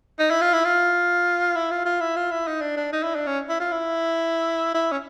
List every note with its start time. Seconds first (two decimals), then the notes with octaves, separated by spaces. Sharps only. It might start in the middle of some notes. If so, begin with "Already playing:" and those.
0.19 D#4
0.30 E4
0.41 F4
0.53 E4
0.64 F4
1.55 E4
1.71 F4
1.85 F4
2.00 E4
2.16 F4
2.31 E4
2.47 D#4
2.61 D4
2.77 D4
2.92 D#4
3.03 E4
3.15 D4
3.27 C#4
3.49 E4
3.60 F4
3.72 E4
4.74 E4
4.92 C#4